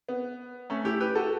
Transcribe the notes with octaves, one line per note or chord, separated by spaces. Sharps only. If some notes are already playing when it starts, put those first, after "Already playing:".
B3
A3 C#4
E4 G4
G4 B4
F#4 A4